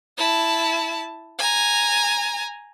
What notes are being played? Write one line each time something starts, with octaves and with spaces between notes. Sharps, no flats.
E4 A5
G#5 A#5